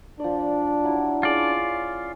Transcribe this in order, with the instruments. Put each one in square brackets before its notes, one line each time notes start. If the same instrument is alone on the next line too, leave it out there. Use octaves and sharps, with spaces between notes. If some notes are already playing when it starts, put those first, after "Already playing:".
[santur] F3 D5 [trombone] D4
[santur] F#3 E4
[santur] C#4 G#4 D#6 [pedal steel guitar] F4 D5